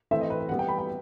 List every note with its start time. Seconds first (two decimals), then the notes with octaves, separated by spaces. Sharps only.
0.11 E3 A3 C4 E5
0.21 D#5
0.30 B4
0.41 B4
0.49 E3 G3 B3 F#5
0.59 G5
0.68 B5
0.78 G5